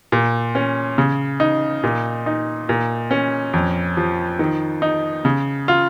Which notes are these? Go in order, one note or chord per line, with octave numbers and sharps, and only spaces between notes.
A#2
C#4
C#3
D#4
A#2
D#4
A#2
C#4
F2
F3
D#3
D#4
C#3
F4